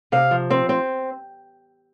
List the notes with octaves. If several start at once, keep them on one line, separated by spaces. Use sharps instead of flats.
C3 F5
F3
C4
C4